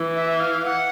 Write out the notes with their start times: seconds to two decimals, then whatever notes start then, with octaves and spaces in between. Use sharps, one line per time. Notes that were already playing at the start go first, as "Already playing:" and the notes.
Already playing: E3
0.16 E5
0.40 F5
0.65 F#5